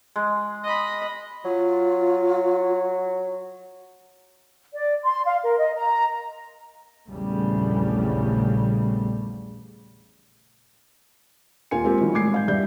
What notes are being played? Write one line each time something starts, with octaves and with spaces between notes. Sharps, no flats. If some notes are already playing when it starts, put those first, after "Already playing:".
G#3
D#5 B5
F#3 F4
D5
C6
F5
A#4
D#5
A#5
A#1 E2 C#3 G3 A3
D#1 D#2 A#3 F4 G#5 C#7
G#3 A#3 C4 F4 G4 A#4
D#3 E3 F#3 G3
A2 G3 G#3 D6 G#6 C7
G#2 F5 G6
E2 G2 G4 D5 E5 G6